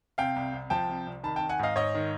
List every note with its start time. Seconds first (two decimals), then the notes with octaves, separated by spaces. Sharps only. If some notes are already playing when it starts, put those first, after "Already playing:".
0.18 C3 F5 G5
0.36 C2
0.53 C2
0.70 F3 G5 A5
0.89 C3
1.07 C2
1.23 D#3 A5 B5
1.36 G5 A5
1.41 D#3
1.49 F#5 G#5
1.59 G#2 D#5 F5
1.76 G#2 C#5 D#5
1.95 D#3